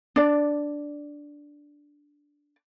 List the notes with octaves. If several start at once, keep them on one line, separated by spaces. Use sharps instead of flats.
D4 D5